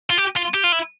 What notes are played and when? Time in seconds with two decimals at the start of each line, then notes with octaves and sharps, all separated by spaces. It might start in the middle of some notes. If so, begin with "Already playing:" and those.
0.10 F4
0.18 G4
0.37 F4
0.54 G4
0.64 F4
0.72 E4